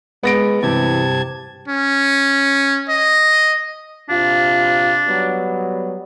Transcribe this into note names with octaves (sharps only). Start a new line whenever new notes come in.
G#3 B3 A#6 D7
G2 C3 E3 A5 G#6
C#4
D#5
C3 D4 F4
F#3 G3 B3